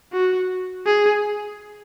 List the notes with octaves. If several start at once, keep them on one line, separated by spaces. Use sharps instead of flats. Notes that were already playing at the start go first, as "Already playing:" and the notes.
F#4
G#4